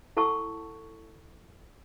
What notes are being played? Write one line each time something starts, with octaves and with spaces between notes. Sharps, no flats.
E4 A4 F#5 A5 C#6 E6